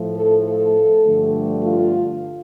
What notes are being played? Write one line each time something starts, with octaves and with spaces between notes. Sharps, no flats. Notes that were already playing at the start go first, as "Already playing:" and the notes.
Already playing: A2 F3 A3
A4
A4
G2 D3 F3 A3
F4